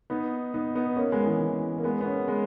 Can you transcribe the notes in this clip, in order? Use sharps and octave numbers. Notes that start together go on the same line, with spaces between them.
B3 D#4
B3 D#4
B3 D#4
A#3 C#4
G#3 B3
E3 G#3
E3
A#3
G#3 B3
B3
A#3 C#4
G#3 B3